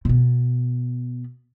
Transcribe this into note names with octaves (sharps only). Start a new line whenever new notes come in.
B2 B3